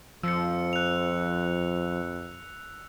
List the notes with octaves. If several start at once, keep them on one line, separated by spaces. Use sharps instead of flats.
F2 F3 E6 C#7
F#6 F7